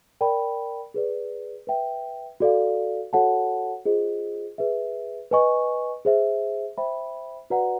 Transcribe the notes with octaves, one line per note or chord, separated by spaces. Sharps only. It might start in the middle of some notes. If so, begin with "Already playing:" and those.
A#4 D5 G5 B5
G#4 B4 D5
B4 E5 G5
F#4 A4 D5 F5
F#4 A4 C#5 F#5 A5
F4 G#4 C5 D#5
G#4 B4 E5
B4 D#5 G#5 C#6
G#4 C5 E5
C5 E5 G5 B5
F#4 B4 D5 F#5 A#5